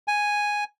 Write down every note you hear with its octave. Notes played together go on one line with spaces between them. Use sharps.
G#5